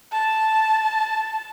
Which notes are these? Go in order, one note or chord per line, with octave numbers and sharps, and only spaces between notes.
A5